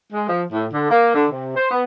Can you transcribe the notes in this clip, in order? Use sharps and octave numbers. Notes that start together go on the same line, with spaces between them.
G#3
F3
A2
D3
A#3
D3
C3
C5
B3